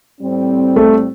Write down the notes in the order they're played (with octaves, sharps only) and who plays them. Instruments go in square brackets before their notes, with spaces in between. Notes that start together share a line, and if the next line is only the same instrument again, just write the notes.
[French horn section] A2 G3 C4
[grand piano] A3